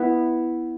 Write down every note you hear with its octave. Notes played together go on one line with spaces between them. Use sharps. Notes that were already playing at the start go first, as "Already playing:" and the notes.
Already playing: B3 E4 B4